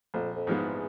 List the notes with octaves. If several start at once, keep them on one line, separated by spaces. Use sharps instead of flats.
A#1 F2
F2
G#2 F3 G#3 B3
E2